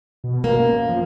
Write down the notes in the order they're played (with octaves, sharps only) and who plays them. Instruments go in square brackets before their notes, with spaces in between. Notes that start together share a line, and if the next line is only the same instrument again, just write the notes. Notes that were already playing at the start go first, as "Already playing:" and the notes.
[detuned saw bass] B2
[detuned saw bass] B2 [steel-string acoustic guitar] A#3
[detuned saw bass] F#2
F3